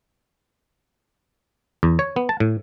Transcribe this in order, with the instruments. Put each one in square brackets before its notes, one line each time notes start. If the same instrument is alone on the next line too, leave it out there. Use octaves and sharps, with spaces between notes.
[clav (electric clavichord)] E2
C#5
B3
A5
A2